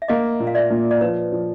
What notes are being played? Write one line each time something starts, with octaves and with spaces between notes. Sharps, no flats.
E5
A#3 D#5 F5
A#2
F5
D5 E5
A#2
D5
F3 B4 C#5
F3